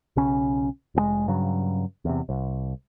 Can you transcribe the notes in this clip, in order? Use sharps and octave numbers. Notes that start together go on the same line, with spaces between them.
B1 C#3 C#4
F1 A#2 G#3
G2 C#3 F#3
E2 C3
C2